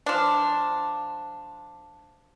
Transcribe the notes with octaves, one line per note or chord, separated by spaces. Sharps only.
F3 D4